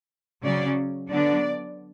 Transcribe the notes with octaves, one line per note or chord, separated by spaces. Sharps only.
C#3 F#3 C#4 D5
D3 F#3 B3 D4 D5